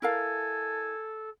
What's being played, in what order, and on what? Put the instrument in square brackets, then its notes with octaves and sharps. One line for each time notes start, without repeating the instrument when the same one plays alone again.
[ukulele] E4 A#4 F5 [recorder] A4 [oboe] G#5